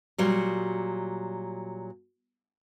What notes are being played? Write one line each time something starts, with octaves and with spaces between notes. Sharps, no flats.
A#2 F#3 G3